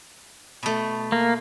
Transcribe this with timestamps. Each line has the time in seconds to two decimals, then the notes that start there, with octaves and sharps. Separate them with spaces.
0.63 B2 A3
1.12 A#3